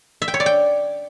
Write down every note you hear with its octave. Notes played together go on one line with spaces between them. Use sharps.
E5
G5
C#5
D5
G5